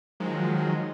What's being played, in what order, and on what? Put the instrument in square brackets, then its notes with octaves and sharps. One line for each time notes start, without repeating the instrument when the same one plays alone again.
[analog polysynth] D#3 F3 F#3 G#3